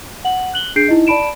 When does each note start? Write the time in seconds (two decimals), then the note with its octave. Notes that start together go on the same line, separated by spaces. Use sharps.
0.25 F#5 F#7
0.54 F#6 F#7 G7
0.76 D4 G#4 G6 C7 D7
0.88 D#4 E4 D#5
1.07 D5 A5 B5 D7 E7